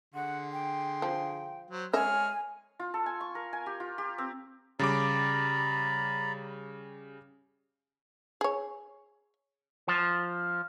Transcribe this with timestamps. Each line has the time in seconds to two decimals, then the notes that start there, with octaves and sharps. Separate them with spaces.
0.14 D3 G#4 F#5 C6
0.52 G5
1.02 F3
1.70 F#3 C5
1.93 G#3 C#5 D#5 E5 G#5 F6
2.79 F4
2.94 A4
3.06 G#5
3.21 C#6
3.35 A#4
3.53 G#5
3.66 G4
3.80 F4
3.98 G4
4.18 C4
4.79 C#3 G3 D5 A#5 B5 D6
8.41 G#4 C#5
9.88 F3